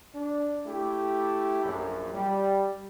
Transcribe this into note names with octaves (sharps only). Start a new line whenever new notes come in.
D4
A3 E4 G4
A#1 F#2
G3